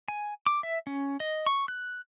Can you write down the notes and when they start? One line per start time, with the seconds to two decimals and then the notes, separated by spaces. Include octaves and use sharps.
0.08 G#5
0.46 D6
0.63 E5
0.87 C#4
1.20 D#5
1.46 C#6
1.68 F#6